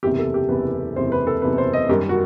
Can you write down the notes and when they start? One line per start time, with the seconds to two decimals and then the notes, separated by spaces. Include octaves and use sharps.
0.03 F#1 E2 C3 G4
0.19 A4
0.34 G4
0.49 F#1 E2 C3 B4
0.96 F#1 E2 C3 C5
1.12 B4
1.27 A4
1.42 F#1 E2 C3 B4
1.58 C5
1.73 D#5
1.89 F#2 D#3 G3 G4
2.09 F#4